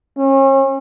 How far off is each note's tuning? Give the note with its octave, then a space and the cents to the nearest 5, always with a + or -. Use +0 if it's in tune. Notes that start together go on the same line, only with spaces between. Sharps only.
C#4 -40